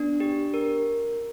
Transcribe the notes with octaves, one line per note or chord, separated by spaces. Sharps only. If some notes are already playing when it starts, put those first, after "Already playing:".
Already playing: B3 D4
G4
A#4